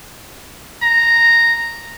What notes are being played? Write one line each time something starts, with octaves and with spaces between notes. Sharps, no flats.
A#5